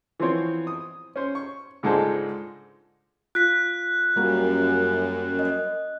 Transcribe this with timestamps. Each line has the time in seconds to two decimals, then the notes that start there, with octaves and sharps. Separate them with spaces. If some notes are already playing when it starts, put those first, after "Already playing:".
0.20 E3 F3 B3 C4 C5 C#5
0.67 D#6
1.16 C#4 C5
1.35 C#6
1.83 C#2 G#2 G#3 D4 A4 C5
3.35 F4 F#6 B6
4.16 F#2 G3 A#3 F#4
5.39 D#5